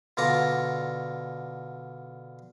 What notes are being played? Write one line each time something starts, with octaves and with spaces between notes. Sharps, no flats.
B2 D3 F4 D5 A#5